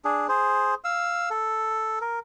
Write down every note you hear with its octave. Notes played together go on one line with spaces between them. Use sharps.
D4 G#4
G#4 C5
F5 E6
A4
A#4